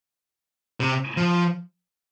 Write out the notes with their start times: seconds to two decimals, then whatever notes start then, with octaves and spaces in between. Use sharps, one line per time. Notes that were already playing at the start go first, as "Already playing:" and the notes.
0.80 C3
1.17 F3